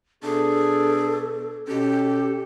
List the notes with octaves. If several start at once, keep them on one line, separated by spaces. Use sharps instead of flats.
B2 D4 G#4 A4
B2 C#4 G4 A4